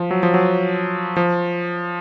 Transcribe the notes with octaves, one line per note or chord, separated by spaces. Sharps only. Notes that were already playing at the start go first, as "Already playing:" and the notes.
Already playing: F3
F#3
F3
F#3
F3